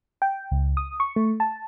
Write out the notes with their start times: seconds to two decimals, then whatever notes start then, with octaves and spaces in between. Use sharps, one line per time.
0.22 G5
0.51 C#2
0.77 D#6
1.00 C#6
1.16 A3
1.40 A5